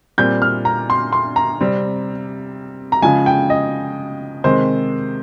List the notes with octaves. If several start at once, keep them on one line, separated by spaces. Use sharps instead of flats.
A#2 G3 C4 G6
F6
A#5
C6
C6
A#5
C3 G3 C4
A#5
C#3 F3 G#3 G#5
G5
D#5
C3 D#3 G#3 C5